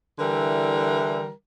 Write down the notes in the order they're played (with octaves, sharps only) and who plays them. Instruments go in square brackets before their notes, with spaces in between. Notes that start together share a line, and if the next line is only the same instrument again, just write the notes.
[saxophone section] D3 E3 G3 E4 A#4